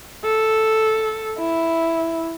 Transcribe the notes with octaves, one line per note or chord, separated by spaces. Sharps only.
A4
E4